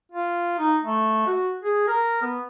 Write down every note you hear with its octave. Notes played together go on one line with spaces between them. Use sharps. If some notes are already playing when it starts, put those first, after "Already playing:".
F4
D#4
A3
F#4
G#4
A#4
B3